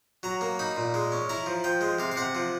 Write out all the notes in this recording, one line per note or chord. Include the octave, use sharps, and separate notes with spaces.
F#3 A#5
A#3
D#4 B5
A#2
G#3
C#4
E4 A#5
F3
F3 G5
G#3
C3 F5
F5
C3 F#5
F3